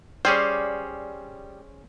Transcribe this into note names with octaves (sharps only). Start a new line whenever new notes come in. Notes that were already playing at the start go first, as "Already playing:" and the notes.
G3 C#4 G#4 C5 D5